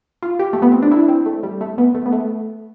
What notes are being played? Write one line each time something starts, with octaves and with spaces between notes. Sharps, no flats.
F4
G4
A3
B3
C4
D4
E4
C4
A3
G3
A3
B3
A3
B3
A3